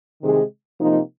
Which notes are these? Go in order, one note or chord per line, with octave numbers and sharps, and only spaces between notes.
C3 D#3 G#3
C3 F3 A#3 D#4